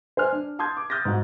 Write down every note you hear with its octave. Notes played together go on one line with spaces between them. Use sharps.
C5 G#5 F6
D4
A5 C6 D#6 G6 G#6
D6
D#6 F6 G6 A6 A#6
G#2 F#4